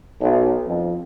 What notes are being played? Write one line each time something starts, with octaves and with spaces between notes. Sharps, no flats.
B1
F2